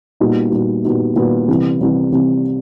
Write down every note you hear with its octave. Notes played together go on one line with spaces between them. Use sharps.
A#2 G3 B3 D#4 F#4
A#2 G3 B3 D#4 F#4
A#2 G3 B3 D#4 F#4
A#2 G3 B3 D#4 F#4
C2 C3 E3
C2 C3 E3
C2 C3 E3